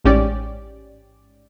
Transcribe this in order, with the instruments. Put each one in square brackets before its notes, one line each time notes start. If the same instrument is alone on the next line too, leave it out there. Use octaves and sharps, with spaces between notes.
[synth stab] A1 G#2 C#4 G4 D5